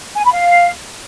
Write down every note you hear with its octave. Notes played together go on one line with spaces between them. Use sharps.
G#5
B5
F5